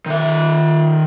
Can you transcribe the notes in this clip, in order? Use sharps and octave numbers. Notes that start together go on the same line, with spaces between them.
D#3 E5